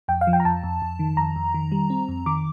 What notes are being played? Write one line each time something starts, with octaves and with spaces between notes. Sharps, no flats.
F2 G5
F5
F3
G5
A#5
F2 A5
F2
F2
D#3
F2 A#5
F2
D#3
G3
C4
F2
D#3 D6